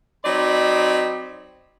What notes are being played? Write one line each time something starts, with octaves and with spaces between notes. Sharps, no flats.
F#3 C4 D#4 D5 B5